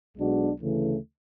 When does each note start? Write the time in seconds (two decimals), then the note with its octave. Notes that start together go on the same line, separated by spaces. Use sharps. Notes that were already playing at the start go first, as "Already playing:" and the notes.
0.17 B1 B2 G#3 D4 F#4
0.61 D2 C#3 E3 A3